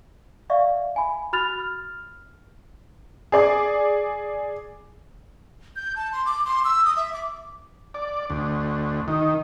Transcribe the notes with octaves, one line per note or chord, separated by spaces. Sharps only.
D5 E5 F5 C#6
G#5 B5
F#4 B5 F6 F#6 A6 F7
F6
G#4 D5 D6
G6
A5
C6
D6
C6
E6
D#6
E5
D6
D5
D2
D#3